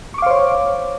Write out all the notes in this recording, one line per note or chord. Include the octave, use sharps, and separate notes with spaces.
C5 C#5 F5 C#6 D6